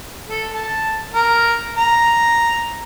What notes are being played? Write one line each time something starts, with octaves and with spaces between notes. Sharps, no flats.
A4
A5
A#4
A#5